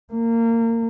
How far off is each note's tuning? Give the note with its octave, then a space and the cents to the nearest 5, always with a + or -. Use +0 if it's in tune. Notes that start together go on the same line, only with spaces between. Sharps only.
A#3 -25